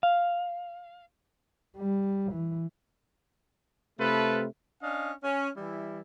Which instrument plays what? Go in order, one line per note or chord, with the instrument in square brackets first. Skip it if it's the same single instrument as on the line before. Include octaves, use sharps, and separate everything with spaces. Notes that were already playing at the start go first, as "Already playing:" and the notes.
[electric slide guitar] F5
[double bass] G3
E3
[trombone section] C3 A3 [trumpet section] F4 A4 B4
[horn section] C#4 D4 D#5 F5
C#4
E3 G3 E4